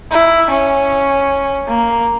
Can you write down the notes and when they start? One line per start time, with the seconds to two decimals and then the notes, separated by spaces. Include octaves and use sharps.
0.11 E4
0.50 C#4
1.67 A#3